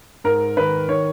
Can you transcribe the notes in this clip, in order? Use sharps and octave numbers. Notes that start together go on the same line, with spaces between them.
G#2 A#4
D#3 B4
D#3 C#5